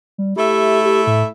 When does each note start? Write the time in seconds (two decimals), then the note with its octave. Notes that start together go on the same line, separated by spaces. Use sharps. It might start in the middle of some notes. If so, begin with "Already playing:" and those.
0.18 G3
0.36 A3 E4 G4 E5
0.85 G4
1.07 A2